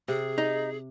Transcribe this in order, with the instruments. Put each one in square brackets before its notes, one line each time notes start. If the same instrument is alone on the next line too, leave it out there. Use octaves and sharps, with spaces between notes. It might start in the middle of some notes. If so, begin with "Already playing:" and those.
[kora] C3 [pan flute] G#4
[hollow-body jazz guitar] D#4